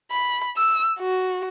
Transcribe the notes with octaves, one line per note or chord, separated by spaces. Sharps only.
B5
E6
F#4